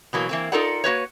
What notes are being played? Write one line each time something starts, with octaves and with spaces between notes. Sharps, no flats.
B2 E3 F#3 A#3
E3 A#3 C4
D#4 F4 A4 A#4 D5 F#5
A#3 F#4 B4 C#5